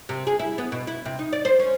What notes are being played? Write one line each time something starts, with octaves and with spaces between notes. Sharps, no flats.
C3
G#4
E4
B3
B2
E4
C3
D#4
D5
C5
C#4